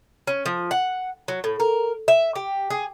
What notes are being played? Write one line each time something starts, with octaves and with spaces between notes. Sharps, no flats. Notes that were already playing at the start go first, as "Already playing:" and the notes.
C#4
F3
F#5
F#3
A2
A#4
E5
G4
G#4